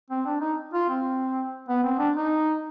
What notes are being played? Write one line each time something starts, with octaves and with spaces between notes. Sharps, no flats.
C4
D4
D#4
F4
C4
B3
C4
D4
D#4